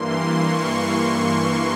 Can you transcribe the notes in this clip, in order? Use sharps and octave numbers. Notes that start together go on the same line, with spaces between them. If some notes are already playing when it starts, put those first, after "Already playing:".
Already playing: G2 E3 A#3 C6
C#6